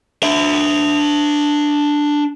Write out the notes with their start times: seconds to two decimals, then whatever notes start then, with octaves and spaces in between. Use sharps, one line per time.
0.23 D4 E5